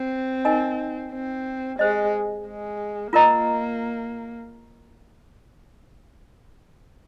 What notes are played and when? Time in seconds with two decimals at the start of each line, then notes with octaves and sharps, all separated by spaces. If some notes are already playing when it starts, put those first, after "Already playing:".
Already playing: C4
0.45 D#4 A#4 D#5 G#5
1.12 C4
1.79 G#3 G4 C5 D#5
2.46 G#3
3.13 A#3 F4 A#4 D#5 A#5